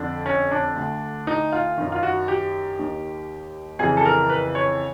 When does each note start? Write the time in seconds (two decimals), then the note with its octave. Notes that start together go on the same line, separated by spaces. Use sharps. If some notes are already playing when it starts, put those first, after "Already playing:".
Already playing: F2 D3 D4
0.26 C#4
0.51 D4
0.76 D2 D3
1.27 D#4
1.52 F4
1.78 F#2 D#3
1.92 F4
2.03 F#4
2.28 G4
2.79 D#2 D#3
3.79 F2 C#3 E3 G#4
3.97 A4
4.05 A#4
4.29 B4
4.55 C#5